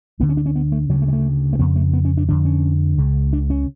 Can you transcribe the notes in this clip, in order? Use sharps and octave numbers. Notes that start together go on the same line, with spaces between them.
D2 D3 B3
C#4
D4
C#4
B3
A3
D2 C#3 F#3
A3
G#3
A3
A3
F2 C#3 B3
A3
B3
C#4
D4
F2 D3 D4
C#4
C#2 C#3
D4
C#4